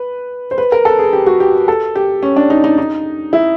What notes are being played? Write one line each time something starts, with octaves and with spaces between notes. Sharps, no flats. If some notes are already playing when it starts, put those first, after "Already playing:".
Already playing: B4
C5
B4
A#4
A4
G#4
G4
F#4
G4
A4
G4
C#4
D4
D#4
D#4
D#4
E4